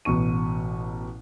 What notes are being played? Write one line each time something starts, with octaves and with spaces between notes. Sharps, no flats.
A1 B2 C#6 D#7